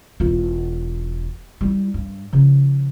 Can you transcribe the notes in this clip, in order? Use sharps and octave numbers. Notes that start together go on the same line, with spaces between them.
E1 F4
G3 E4
G2
C#3 F3